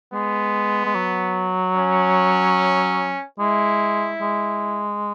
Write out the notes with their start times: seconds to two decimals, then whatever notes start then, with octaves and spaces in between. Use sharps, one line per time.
0.14 G#3 B3
0.86 G#3
0.95 F#3
1.76 C#4
3.39 G#3 E4
4.22 G#3